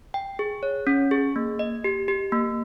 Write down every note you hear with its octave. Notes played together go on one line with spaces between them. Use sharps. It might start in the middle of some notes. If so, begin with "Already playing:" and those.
G5
G#4
C#5
C#4
G#4
A#3
D#5
G4
G4
A#3